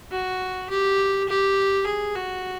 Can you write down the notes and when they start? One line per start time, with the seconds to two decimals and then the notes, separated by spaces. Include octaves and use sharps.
0.11 F#4
0.70 G4
1.28 G4
1.86 G#4
2.15 F#4